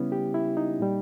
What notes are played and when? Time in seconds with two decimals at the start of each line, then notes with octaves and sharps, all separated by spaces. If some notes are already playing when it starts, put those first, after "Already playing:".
Already playing: C#3 G3 B3 C#4 E4
0.12 G4
0.34 E4
0.57 D#4
0.80 A#2 G3